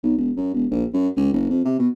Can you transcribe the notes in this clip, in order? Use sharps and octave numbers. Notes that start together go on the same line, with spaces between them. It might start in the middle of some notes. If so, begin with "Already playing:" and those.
B1
E1
F#2
E1
A#1
F#2
C#2
F#1
F2
C3
B2